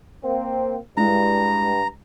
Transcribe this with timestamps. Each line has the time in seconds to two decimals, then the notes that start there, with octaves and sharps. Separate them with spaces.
0.24 A#3 C4
0.97 G2 G#3 E4 A#5